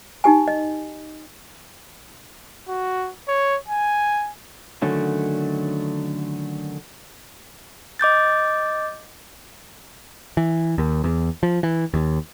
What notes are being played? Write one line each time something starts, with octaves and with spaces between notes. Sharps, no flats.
D#4 G4 G#5
D#5
F#4
C#5
G#5
D3 D#3 F#3 A3 C#4
D#5 D6 G6 A6
E3
D#2
E2
F3
E3
D#2